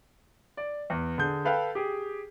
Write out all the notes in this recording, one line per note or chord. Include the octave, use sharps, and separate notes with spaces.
D5
E2
D3 G#4 G6
A4 B4 F5 G5
G4 G#4